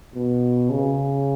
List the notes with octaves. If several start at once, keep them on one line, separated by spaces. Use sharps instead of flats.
B2
C#3